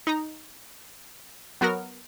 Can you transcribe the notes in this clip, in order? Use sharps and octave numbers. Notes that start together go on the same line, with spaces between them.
D#4 A#5
F#3 B3 F#4 A#4 F6